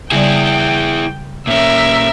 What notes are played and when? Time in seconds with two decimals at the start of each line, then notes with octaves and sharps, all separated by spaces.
0.12 C#3 G3 E4 G#4 D5 G5
1.47 A#2 C#4 A#4 E5